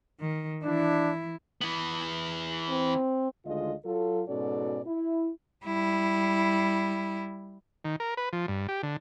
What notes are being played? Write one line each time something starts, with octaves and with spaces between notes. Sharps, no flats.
D#3
E3 D4 E4
E3 B3
C4
D2 D3 D#3 G#3 F4 D#5
F#3 F4 A4
G#2 B2 C#4 F#4 A4 D5
E4
G3 E4
D#3
A#4
B4
F3
G2
G4
D3